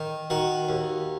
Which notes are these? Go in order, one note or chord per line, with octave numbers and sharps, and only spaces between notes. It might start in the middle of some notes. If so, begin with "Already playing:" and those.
Already playing: D#3
D#3 F#4
D#2